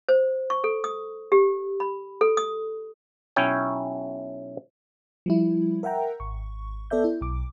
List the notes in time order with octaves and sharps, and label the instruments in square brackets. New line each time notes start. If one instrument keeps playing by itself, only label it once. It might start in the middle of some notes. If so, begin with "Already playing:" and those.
[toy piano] C5
C#6
A4
D#6
G4
B5
A4
D#6
[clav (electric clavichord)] B1 C#4 E4 C#5 G5
[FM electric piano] F3 G3 E4
A#4 E5 F#5 G5 A#5
G#1 C#6
B3 A4 D5 E5 G6
E4
B1 D6